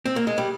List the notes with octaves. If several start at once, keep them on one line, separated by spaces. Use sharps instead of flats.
C4
A#3
G#3
G3